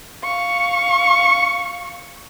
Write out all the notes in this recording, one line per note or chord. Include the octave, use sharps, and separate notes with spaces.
F5 C#6